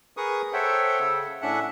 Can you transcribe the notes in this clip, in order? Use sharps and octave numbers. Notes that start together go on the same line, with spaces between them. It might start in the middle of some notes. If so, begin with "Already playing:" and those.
G#4 A#4 B4 C#6 D#6
A4 C5 C#5 E5 F#5 G5
C#3 A4
A2 C#4 D4 E5 F#5 F#6